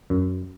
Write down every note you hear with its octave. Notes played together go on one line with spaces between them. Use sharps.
F#2